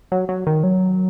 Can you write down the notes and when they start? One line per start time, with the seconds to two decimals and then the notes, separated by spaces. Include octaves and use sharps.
0.12 F#3
0.29 F#3
0.47 D#3
0.63 F#3